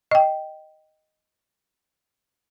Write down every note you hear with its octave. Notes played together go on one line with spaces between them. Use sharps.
D#5 G5